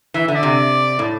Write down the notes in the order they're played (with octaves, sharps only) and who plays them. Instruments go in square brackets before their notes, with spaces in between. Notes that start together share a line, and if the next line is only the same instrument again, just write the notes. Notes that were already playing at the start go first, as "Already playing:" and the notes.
[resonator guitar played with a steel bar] E3 [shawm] E5
[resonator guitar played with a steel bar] D3 [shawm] E5
[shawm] D5
[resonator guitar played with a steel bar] C3
A2